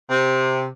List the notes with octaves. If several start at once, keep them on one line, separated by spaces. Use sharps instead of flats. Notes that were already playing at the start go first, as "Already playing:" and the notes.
C3